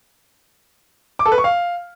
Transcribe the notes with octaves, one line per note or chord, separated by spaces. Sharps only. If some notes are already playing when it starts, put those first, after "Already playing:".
D6
A4
B4
C#6
F5